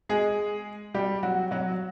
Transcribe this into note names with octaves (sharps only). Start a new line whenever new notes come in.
G#3 G#4
G3 G4
F#3 F#4
F#3 F#4